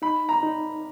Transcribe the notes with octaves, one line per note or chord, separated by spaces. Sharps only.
D#4 B5
A#5
D#4